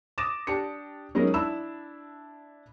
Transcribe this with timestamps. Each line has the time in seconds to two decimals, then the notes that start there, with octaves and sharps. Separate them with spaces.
0.18 D6 D#6 A6 A#6 E7
0.47 D4 G4 C#7
1.15 F#3 G#3 C#4 D#4 A#4
1.34 D4 E4 B5 E6 E7